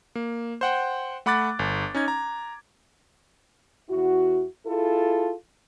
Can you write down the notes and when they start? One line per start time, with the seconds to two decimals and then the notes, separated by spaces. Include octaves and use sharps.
0.16 A#3
0.61 C5 F#5 G5
1.26 A3 F#5 B5 D6 F#6 A6
1.59 G1
1.95 C#4 D#4 G#6
2.08 A#5
3.89 E2 E4 F#4
4.66 E4 F4 G#4 A4